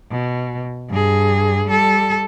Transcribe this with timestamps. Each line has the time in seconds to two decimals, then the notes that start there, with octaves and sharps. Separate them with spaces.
0.11 B2
0.90 G2 G#4
1.68 G3 A4